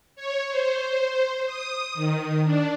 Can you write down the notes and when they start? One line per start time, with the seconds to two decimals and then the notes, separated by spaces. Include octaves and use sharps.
0.16 C#5
0.49 C5
1.46 D#6
1.94 D#3
2.45 D4